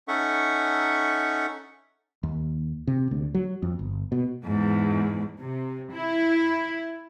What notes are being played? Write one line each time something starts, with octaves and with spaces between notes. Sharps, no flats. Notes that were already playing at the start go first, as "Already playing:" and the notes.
C#4 D#4 A4 E5 F#5 C#6
D#2
C3
D2
F#3
F2
G1
B2
E2 G#2
C3
E4